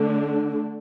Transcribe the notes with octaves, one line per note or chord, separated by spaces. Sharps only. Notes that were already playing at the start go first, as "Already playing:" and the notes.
Already playing: D3 A3 D4